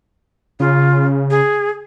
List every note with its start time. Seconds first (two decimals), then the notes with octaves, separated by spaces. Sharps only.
0.60 C#3 F4
1.30 G#4